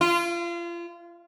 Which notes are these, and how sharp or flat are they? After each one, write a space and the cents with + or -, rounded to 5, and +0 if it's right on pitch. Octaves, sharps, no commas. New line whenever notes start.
F4 -30